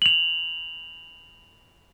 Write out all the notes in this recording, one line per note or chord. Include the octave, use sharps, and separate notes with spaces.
F7 F#7